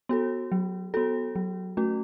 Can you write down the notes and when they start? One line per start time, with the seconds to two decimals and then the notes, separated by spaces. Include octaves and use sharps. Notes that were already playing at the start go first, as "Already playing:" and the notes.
0.09 B3 F#4 A4
0.52 F#3
0.94 B3 F#4 A4
1.36 F#3
1.77 A3 C#4 F#4